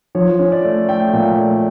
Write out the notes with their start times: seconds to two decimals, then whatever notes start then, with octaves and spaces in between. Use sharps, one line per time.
0.15 F3 C#5
0.39 C#4
0.52 D5
0.64 A3
0.88 A3 G5
1.13 A#2
1.38 A3